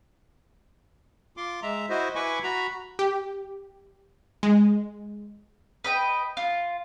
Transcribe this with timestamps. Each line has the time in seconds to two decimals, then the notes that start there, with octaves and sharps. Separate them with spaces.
1.37 F4 C6 D6
1.63 G#3 E5 A#5
1.90 E4 F#4 C5 D#5
2.15 E4 B4 G#5 B5 C#6 D6
2.43 F#4 A#5 B5
2.99 G4
4.43 G#3
5.84 B4 D#5 G5
6.37 F4